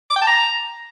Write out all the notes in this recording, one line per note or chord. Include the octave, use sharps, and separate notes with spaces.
D6
G5
A5
A#5